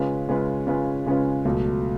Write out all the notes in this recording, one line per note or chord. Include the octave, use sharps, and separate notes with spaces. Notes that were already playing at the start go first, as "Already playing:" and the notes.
Already playing: C#3 G#3 C#4 F4 B4
C#3 G#3 C#4 F4 B4
C#3 G#3 C#4 F4 B4
C#3 G#3 C#4 F4 B4
C#2 B2 F#3 A3